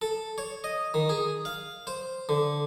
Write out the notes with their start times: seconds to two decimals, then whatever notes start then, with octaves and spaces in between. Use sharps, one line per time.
0.02 A4
0.38 C#5
0.64 D#5
0.94 D#3
1.09 G#4
1.45 F5
1.87 C5
2.29 D3